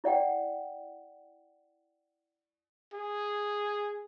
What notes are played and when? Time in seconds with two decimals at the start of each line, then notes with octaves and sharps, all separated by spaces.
0.04 E4 D5 F#5 G5
2.94 G#4